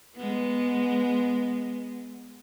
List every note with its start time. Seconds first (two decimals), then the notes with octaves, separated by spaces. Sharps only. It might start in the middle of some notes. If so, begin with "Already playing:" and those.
0.16 G#3 B3